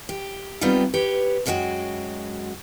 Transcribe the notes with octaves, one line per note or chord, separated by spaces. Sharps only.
G4
G3 B3 C4 D#4 F4
G4 B4 C#5
F#2 F#3 G#3 A#3 F#4 G5